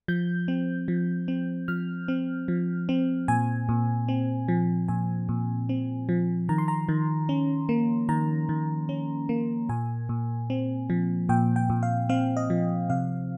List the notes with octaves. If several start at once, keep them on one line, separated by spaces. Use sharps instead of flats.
F3 G6
C4
F3
C4
F3 F6
C4
F3
C4
A#2 G#5
A#2
C4
F3
A#2 G#5
A#2
C4
F3
D#3 A#5
C6
A#5
D#3
C#4
A#3
D#3 A#5
D#3
C#4
A#3
A#2 G#5
A#2
C4
F3
A#2 G5
G5
A#2
F5
C4 F5
D#5
F3
C3 F5